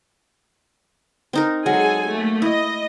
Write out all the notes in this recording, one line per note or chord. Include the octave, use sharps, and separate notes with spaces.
C4 D#4 A#4
F#3 G#3 G#4 A4 G#5
A3 A#3
E4 D#5